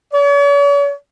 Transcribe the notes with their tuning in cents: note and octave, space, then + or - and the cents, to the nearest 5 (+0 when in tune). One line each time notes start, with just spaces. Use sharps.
C#5 +45